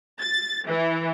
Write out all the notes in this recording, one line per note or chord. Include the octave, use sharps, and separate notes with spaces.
A6
E3